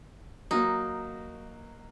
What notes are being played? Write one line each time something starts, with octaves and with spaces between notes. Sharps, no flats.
F#3 A#3 D#4